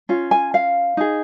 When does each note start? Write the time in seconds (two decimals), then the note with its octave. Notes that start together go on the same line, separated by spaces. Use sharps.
0.09 C#4 F4
0.31 G#5
0.54 F5
0.97 D#4 G#4